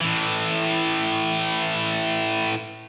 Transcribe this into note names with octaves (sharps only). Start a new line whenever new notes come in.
A2 E3